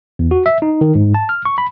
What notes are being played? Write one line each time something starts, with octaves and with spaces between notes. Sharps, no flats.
E2
F#4
E5
D#4
D#3
G#2
A5
F6
C#6
B5